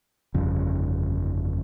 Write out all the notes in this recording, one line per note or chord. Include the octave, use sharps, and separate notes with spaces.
G1 F2 C#3